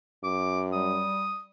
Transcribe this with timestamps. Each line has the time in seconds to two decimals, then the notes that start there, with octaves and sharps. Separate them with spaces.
0.24 F#2 D6
0.72 G3 D#6